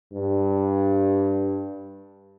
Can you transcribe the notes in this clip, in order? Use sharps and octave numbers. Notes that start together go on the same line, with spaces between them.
G2